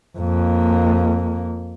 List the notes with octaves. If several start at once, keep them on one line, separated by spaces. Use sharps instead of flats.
F2 A#3